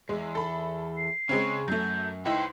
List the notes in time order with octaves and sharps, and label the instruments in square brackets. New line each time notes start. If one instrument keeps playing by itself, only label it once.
[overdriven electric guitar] E2 G#2 [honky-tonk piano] G#3
[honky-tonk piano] A4 B5
[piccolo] C7
[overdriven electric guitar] C#3 [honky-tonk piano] G#3 C4 C#4
[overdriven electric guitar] F#2 [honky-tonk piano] F#3 A3 [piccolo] G6
[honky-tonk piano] C#2 D#4 E4 [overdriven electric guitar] B4 C5 [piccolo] G5